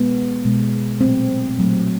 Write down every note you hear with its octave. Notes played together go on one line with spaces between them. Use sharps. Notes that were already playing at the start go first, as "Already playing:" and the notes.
Already playing: B2 G#3 B3
B2 G#3
A#2 F#3 A3 C4
A#2 F#3 A3